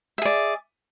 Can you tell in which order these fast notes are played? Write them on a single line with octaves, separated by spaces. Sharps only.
E5 G#4 D5